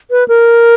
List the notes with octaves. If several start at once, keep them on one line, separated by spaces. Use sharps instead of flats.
B4
A#4